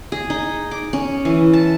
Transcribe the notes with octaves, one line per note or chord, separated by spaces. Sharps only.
G#4
D#4
D6
C#4
E3
A5